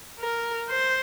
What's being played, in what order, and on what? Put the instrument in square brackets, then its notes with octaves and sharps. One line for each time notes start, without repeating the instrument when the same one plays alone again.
[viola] A#4
C5